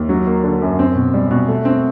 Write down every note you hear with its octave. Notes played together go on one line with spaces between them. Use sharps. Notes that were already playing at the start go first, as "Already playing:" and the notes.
Already playing: D#2
F#3
A#3
D3
F#2
C4
B2
G3
B2
A3
C4